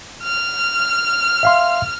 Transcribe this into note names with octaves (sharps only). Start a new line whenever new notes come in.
F6
E5 F5 C6